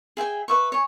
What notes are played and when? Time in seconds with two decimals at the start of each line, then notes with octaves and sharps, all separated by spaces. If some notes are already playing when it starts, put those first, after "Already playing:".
0.17 G#4 E5 G5 G#5
0.48 B4 E5 C#6
0.72 C#5 G#5